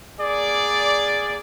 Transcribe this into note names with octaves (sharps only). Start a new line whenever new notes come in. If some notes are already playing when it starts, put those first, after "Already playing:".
A#3 G#4 D5